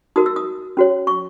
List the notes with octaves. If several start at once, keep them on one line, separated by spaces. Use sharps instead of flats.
D#4 F#4 A#4 D#6
E6
D#6
C#4 F#4 C#5
C#6